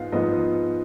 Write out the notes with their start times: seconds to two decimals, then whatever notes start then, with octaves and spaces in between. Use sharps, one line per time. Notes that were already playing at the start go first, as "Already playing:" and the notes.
Already playing: G#2 F3 B3 F5
0.12 G#2 F3 B3 D#5